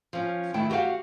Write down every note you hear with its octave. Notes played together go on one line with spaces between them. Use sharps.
F3 C#4
D#3 A3 E4 G5
F#4 G4 C5 F5 F#5